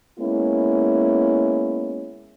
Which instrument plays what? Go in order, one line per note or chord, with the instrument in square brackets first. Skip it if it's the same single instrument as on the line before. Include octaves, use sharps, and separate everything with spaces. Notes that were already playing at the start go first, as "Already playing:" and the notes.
[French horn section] G#3 A#3 B3 C#4 E4